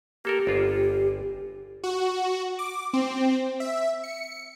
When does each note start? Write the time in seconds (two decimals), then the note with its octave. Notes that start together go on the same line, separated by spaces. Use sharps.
0.25 A#3 G4 A4 A#4
0.47 G1 F4 G#4
1.83 F#4
2.59 D6
2.93 C4
3.60 E5
4.04 C#7